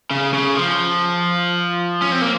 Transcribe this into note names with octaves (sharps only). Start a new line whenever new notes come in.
C#3
C#3
F3
C#4
C4
A#3